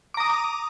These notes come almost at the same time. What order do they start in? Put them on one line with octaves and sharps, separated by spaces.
D6 A#5 D#6